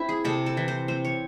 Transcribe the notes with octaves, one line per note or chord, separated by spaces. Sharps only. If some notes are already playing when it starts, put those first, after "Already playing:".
Already playing: C4 E4
G#4
C3 A4
A4
E3
C5
C4 C5
C#5